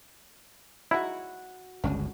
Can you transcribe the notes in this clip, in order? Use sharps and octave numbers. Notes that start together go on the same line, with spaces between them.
F#3 G#3 D#4 E4 F#4 F#5
G1 C#2 C#4 D4 G#4